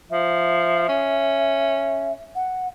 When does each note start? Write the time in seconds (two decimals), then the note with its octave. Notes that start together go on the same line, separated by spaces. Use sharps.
0.10 F3 E5
0.89 C#4
2.35 F#5